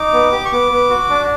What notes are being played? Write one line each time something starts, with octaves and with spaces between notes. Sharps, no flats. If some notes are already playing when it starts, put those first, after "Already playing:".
Already playing: D#4 D6
B3
G4
C#6
B3 D6
B3
F#4
D4